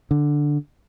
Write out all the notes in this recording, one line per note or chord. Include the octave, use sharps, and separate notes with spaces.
D3